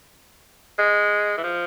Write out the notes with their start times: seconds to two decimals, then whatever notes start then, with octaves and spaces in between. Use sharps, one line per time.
0.79 G#3
1.37 E3
1.44 F3